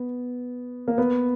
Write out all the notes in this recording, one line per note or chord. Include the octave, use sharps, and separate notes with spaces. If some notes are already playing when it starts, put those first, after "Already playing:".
Already playing: B3
A#3
B3